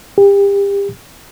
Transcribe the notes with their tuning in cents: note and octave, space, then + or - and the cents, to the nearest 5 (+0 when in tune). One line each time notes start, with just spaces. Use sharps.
G4 +30